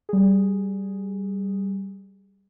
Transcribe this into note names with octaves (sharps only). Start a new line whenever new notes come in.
G3 G#4